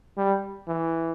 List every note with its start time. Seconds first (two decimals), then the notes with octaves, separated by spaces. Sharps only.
0.18 G3
0.68 E3